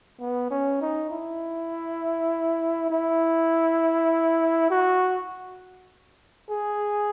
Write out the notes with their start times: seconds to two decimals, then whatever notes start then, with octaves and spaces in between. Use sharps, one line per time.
0.20 B3
0.50 C#4
0.81 D#4
1.11 E4
2.90 E4
4.70 F#4
6.50 G#4